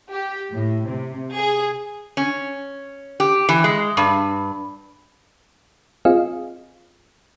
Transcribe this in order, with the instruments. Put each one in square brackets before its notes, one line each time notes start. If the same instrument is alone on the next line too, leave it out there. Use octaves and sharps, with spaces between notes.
[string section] G4
A2
C3
G#4
[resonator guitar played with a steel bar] C#4
G4
E3
G#3
G2
[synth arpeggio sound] C4 F4 G#4 D#5 F5